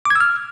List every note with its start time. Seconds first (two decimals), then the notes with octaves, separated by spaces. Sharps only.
0.05 D6
0.10 G#6
0.15 E6
0.20 F6